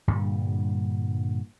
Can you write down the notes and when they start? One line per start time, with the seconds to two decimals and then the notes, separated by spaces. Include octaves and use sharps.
0.08 G2 A#2 D3 G3